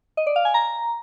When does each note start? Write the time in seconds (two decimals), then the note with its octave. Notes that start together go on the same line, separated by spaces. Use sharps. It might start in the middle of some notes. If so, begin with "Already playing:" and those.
0.17 D#5
0.27 D5
0.36 F5
0.45 G#5
0.54 A#5